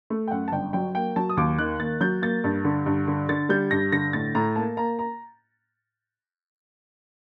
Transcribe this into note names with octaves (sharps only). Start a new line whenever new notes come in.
A3
G5
F#2 F#5
A5
G1 G5
F#3 G5
A#3 G5
F#3 A5
D#6
D#2 D6
D#3 F#6
A#3 A6
F#3 G6
A#3 A6
G2
D3
G2
D3
D3 A6
G3 G6
G2 A#6
D3 A#6
A2 A6
A2 A#5
A#3 A5
A#3 A#5
A#5